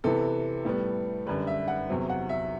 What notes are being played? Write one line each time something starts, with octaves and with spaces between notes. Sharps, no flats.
C3 E3 B3 A4
A2 G3 B3
F#2 D3 G3 B4
E5
F#5
E2 C3 F#3 C4
F#5
E5